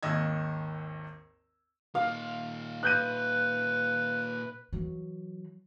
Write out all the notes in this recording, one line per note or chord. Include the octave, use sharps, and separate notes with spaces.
G#1 D#2 D#5 E6 G#6
A#2 D#4 F5
B4 F#6 G6 D#7
E3 F#3